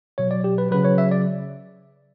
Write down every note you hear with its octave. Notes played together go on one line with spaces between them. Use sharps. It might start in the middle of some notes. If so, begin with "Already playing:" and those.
B2 F#3 C#5
D5
G4
B4
C#3 F#3 B4
C#5
E5
D5